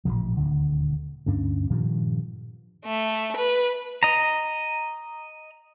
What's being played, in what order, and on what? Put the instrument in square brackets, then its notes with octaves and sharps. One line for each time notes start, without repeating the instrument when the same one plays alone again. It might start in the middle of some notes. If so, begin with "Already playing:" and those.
[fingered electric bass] A1 A#2 D3 F3
D#1 D2 D3
D2 G2 C#4 D4
G2 A#2 D#3 F3
[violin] A3
B4
[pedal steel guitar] D#5 A#5